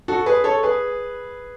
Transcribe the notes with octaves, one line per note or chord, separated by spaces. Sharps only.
F#4 A4
G#4 B4
A4 C#5
G#4 B4